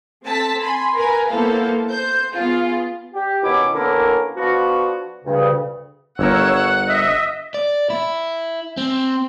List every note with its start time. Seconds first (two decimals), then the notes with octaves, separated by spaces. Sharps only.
0.24 C4 A4 A5 B6
0.61 G#5 B5 C6
0.95 A#4 B4 G#5 A#5 B5
1.29 A#3 B3 E4 A4 C5 F5
1.89 C5 G6
2.32 B3 F4 G#4
3.13 G4
3.43 B2 D#3 B3 C#4 E4 D6
3.74 D3 A#3 B3 C#4 E4 A#4
4.37 F3 B3 D4 F4 F#4
5.25 D2 G2 C#3
6.19 G1 A#4 C#5 F#5 E6
6.88 D#5 E5
7.54 D5
7.90 E4
8.77 C4